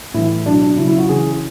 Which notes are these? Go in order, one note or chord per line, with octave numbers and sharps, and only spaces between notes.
A2 E3 E4
B2 F#3 D4
D4
C#3 F#3 E4
E4
F#4
C#3 E3 G#4